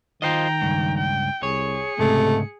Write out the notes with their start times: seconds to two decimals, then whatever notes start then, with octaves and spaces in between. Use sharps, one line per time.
0.22 D#3 F4 C5 D#5 G5 A#5
0.62 C#2 G2
0.97 G5
1.43 C2 G#4 C#5 C#7
1.99 C#2 G#2 C3 A3